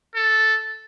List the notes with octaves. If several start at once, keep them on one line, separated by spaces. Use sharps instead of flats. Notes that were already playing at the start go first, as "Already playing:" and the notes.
A4